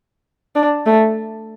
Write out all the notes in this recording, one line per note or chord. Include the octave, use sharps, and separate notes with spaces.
D4
A3